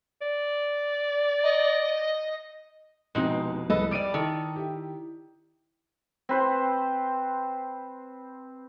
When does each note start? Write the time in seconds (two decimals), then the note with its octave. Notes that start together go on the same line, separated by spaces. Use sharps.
0.22 D5
1.43 D#5
3.15 F1 B2 G#3 C4 D#4 E4
3.70 C2 F2 G#2 A4 B4 D#5
3.91 G3 D5 D6 D7 D#7
4.14 D#3 D#4 E4 A4
4.56 E4 G4
6.29 C4 B4 C5